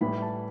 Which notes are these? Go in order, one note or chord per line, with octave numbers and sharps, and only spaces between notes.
A1 A2 E3 G3 B5
A5